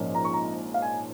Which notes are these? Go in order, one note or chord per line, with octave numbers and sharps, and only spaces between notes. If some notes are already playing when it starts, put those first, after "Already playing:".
Already playing: A#1 G#2 F3 A#3 C#4
A#5
C#6
A#5
F5
G#5